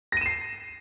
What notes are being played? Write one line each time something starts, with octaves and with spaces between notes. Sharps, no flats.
A#6 C7 D#7 E7